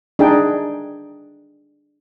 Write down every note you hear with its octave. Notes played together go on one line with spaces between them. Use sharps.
D4 D#4 G#4 G5